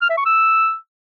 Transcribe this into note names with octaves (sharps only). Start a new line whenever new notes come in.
F6
E5
C#6
E6